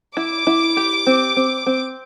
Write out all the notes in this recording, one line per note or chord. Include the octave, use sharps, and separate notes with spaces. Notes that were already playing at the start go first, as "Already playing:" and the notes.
E4 D6
E4
G4
C4
C4
C4